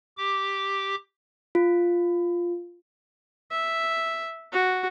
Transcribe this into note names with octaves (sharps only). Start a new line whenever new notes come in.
G4 D6
F4
E5
F#4